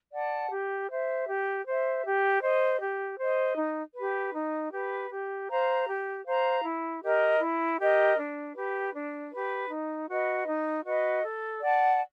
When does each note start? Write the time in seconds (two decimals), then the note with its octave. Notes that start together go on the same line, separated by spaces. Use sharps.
0.12 D5 F#5 A5
0.51 G4
0.89 C5 E5
1.27 G4
1.66 C5 E5
2.04 G4
2.42 C5 D#5
2.81 G4
3.18 C5 D#5
3.58 D#4
3.95 G4 B4
4.34 D#4
4.72 G4 B4
5.10 G4
5.48 C5 F5 A#5
5.86 G4
6.25 C5 F5 A#5
6.64 E4
7.02 G4 A#4 D#5
7.40 E4
7.78 G4 A#4 D#5
8.17 D4
8.54 G4 B4
8.94 D4
9.32 G4 B4
9.69 D#4
10.08 F#4 B4 D#5
10.46 D#4
10.84 F#4 B4 D#5
11.23 A4
11.61 D5 F#5 A5